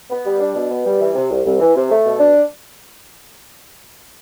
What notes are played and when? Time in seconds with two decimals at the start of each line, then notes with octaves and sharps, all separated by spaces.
0.10 B3
0.24 G3
0.40 D4
0.55 B2
0.70 B3
0.85 G3
1.00 E3
1.15 C3
1.30 C2
1.45 C2
1.60 E3
1.75 C3
1.90 A3
2.05 B2
2.19 D4